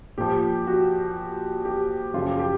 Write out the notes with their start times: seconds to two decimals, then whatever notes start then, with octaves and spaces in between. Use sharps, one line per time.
0.18 A#2 F3 G4
0.67 F#4
1.65 G4
2.14 F#2 C#3 F3 F4
2.26 G4
2.39 G4